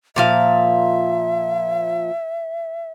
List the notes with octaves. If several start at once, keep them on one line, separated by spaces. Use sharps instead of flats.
A#2 F3 E5 F5